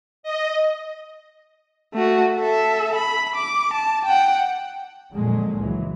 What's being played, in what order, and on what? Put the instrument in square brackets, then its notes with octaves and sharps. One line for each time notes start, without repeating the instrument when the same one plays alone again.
[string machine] D#5
[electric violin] A3 F#4
A4 E5
B5
D6
A5
F#5 G5
[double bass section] F2 A#2 D3 F#3 G#3
C#2 E3 F#3